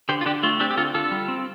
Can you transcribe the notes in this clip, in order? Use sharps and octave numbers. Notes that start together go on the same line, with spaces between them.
D3 G4 C5
F4
D3 D4 G4
A3 F4
C4 D4 G4
G4
D3 F4 A4
D3 F4 A4
G3
C4